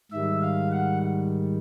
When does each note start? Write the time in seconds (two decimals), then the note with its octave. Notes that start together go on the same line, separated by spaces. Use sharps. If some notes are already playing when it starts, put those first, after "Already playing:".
0.11 G#2 D#3 G3 E5
0.42 F5
0.72 F#5